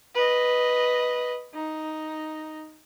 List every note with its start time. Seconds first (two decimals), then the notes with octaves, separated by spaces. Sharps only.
0.14 B4 D#5
1.54 D#4